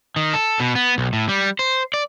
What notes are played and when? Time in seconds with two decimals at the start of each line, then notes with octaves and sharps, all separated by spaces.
0.16 D#3
0.34 A4
0.60 B2
0.75 B3
0.98 B1
1.13 A2
1.29 G3
1.59 C5
1.94 D5